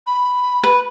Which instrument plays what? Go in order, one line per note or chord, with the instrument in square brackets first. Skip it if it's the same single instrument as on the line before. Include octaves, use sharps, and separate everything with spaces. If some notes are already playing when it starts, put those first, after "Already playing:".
[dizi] B5
[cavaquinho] B4